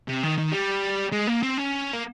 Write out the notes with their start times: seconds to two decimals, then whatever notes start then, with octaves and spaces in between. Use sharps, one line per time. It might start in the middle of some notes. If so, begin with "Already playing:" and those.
0.08 C3
0.24 D#3
0.38 D#3
0.52 G3
1.12 G#3
1.27 A#3
1.43 C4
1.58 C#4
1.93 A#3